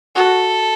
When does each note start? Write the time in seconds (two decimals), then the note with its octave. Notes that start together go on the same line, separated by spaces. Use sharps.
0.15 F#4 A4